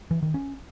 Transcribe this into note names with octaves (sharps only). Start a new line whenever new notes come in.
E3
D#3
C#4